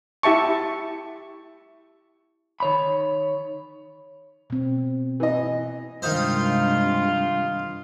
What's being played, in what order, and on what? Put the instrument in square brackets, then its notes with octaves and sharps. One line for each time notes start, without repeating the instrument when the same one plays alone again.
[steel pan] E4 G4 E5 A5 C#6
[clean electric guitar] D#3 C#5 B5
[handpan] B2 C4
[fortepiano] E3 D#5
[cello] G2 [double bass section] C3 G#3 [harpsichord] D#3 D#4 C5 [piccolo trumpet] F4